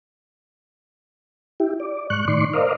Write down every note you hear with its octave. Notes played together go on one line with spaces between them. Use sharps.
E4 G4
D5
G#2 C#6 F#6
A2 D#3 D5 C6 C#6
A#4 C5 D5 D#5 F5